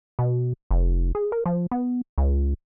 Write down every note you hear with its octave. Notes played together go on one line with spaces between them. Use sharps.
B2
F1
G#4
A#4
F3
B3
C#2